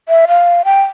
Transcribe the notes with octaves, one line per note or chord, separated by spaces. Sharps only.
E5
F5
G5